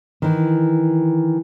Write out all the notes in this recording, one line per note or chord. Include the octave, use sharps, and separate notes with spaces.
D#3 E3